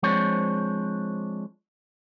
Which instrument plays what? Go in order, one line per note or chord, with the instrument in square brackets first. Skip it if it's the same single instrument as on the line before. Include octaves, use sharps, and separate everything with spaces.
[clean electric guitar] F3 G#3 C4 D4 C5 C#5